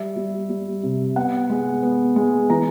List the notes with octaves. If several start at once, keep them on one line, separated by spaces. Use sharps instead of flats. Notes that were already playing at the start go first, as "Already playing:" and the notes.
Already playing: G3 E5
G3
G3
C3
B3 F#5
G#3
B3
G#3
E3 A#5